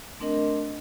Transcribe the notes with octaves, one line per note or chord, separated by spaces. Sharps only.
A3 C4 D4 A#4 D#5